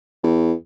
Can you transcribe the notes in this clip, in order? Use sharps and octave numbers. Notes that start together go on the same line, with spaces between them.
E2